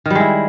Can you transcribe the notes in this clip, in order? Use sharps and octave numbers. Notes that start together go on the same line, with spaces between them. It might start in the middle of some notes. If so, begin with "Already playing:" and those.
D#3 G3 G#3 E4